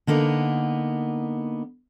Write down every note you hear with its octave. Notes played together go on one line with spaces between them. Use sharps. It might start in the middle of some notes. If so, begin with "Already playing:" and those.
D3 A#3 B3 D#4